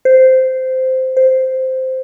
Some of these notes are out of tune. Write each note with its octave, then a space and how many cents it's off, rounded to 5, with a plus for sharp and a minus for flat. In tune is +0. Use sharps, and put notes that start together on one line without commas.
C5 -10
C5 -5